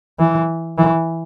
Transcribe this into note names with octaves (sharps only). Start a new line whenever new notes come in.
E3
E3